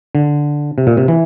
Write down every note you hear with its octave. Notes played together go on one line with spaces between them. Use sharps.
D3
C3
A#2
C3
E3